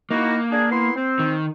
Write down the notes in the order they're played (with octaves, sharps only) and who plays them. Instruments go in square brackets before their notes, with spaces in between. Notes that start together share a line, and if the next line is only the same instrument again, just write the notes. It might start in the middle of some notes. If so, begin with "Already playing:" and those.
[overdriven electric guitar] A#3 [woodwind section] D#4 E4 F#4
[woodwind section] D4 G#4
B3 E4 C6
C4
[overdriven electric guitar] D#3